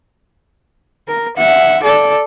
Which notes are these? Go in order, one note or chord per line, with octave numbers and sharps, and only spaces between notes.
A#4
E5 F#5
A4 D5